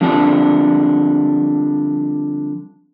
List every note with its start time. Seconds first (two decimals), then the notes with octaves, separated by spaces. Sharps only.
0.01 D3 F3 G3 C4 D4